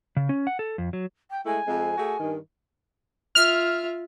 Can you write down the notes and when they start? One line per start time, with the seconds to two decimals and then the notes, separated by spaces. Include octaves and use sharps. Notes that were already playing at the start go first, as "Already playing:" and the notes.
0.16 C#3
0.29 C#4
0.47 F#5
0.59 A4
0.78 F2
0.93 F#3
1.30 G5
1.46 G#3 A3 E4 G#5
1.66 F2 G#3 C4
1.97 A3 F#4 G#4
2.19 G2 D#3
3.35 F4 E5 F6